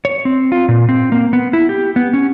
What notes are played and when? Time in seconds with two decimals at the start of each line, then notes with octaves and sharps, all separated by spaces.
0.05 C#5
0.25 C4
0.52 F4
0.68 A#2
0.89 C4
1.12 A#3
1.33 B3
1.53 E4
1.69 G4
1.96 B3
2.13 C#4